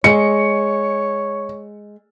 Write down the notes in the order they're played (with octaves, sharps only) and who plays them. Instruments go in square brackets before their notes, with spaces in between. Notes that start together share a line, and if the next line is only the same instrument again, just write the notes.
[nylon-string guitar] G#3 [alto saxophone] C#5 [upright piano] C#7